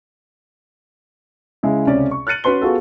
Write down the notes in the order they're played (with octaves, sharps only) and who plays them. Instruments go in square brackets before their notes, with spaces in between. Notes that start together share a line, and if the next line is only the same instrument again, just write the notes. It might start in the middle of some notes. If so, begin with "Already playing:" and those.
[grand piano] C#3 G#3 E4
C#2 C3 C#4 D5
C#6
F6 F#6 A6 C#7 D#7 F#7
C#4 F#4 B4 C6 G7
B3 F4 F#4 G#4 A4